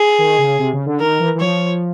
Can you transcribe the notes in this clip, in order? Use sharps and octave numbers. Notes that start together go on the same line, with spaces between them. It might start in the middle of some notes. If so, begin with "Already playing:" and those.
Already playing: G#4
D#3
C#3
C3
C#3
D3
D#3 A#4
E3
E3
F3 C#5